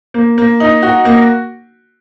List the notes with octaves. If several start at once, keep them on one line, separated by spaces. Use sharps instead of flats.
A#3
A#3
D#4
F#4
A#3